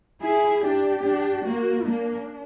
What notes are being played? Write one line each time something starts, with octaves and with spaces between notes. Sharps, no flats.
E4 G#4
D4 G4
D4
A#3 F#4
A#3 D4